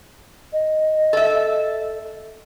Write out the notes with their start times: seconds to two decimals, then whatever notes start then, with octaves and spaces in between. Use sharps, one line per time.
0.53 D#5
1.13 A4 E5